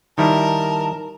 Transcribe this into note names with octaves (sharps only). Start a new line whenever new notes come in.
D#3 G3 E4 A#4 A5